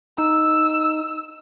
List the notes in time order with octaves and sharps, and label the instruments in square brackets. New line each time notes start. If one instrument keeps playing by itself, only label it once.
[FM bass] D#4 [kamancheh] E6